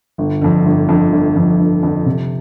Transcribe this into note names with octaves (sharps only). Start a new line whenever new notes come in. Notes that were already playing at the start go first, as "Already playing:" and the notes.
G1
F2 D3
G1
F2 D3
G1
F2 D3
G1
F2 D3
C3